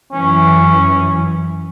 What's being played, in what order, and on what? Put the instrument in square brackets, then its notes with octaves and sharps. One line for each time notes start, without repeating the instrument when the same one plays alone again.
[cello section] F#2 E3 [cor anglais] C#4